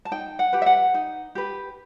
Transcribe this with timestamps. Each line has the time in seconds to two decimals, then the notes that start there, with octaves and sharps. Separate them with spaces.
0.05 A5
0.11 D#4 G5
0.39 F#5
0.53 G4 B4
0.62 E5
0.66 F#5
0.94 D#4
1.35 G4 B4